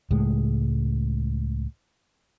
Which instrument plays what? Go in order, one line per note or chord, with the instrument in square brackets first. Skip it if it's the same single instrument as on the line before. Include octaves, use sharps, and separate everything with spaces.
[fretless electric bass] C#2 A2 G#3